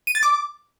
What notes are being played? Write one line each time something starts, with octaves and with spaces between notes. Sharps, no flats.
D#7
A6
D6